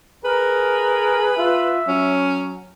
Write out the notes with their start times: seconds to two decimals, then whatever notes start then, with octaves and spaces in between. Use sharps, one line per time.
0.25 G#4 A#4 B4
1.37 F4 E5
1.88 F#3 C#4